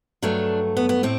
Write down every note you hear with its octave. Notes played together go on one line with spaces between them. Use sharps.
G2 F#3 A3 D4
B3
B3
A2 C4